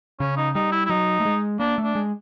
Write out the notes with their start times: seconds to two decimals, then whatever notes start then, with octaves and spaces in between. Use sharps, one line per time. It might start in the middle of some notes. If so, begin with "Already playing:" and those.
0.20 C#3 C#4
0.37 D#4
0.55 G3 D#4
0.72 E4
0.86 E4
0.90 F#3 D#4
1.20 A3
1.25 G#3
1.60 A#3 D4
1.78 A3
1.84 D4
1.95 G#3